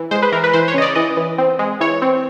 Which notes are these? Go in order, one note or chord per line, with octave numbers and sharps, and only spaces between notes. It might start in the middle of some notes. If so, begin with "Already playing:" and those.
Already playing: E3
G#3 C5
B4
E3 A#4
B4
E3 C5
C#5
C#3 D#5
D5
E3 D#5
E3
C4
G#3
E3 C#5
C4